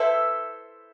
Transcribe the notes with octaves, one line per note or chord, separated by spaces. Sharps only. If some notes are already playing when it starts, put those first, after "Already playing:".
Already playing: E4 A4 B4 C5 E5